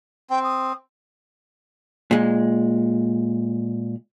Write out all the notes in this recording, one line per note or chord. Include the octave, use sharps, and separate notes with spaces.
C4 G5
D#6
A#2 G#3